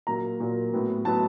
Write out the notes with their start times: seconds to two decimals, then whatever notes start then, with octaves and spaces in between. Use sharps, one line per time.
0.07 A#2 F#3 A#3 A#5
0.40 A#2 F#3 A#3
0.73 A2 F#3 B3
1.05 A2 F#3 B3 A5